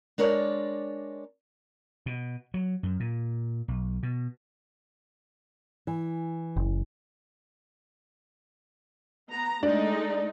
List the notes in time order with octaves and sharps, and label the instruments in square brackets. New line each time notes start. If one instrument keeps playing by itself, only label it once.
[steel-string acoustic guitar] G#3 D4 A#4 C#5 D5
[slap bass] B2
F#3
F#2
A#2
B1
B2
[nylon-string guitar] E3
[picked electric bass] F#1
[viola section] B3 A#5
[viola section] G#3 A3 D#4 [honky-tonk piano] D4